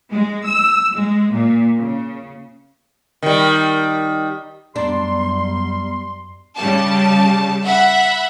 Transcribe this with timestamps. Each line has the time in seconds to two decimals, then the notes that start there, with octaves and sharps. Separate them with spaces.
0.12 G#3
0.45 E6
0.94 G#3
1.32 A#2
1.79 C#3
3.22 D#3 G3
4.76 F#2 G3 B3 D4 D5 A#5 C6
6.56 C#3 G3 A5
7.64 E5 F#5 B5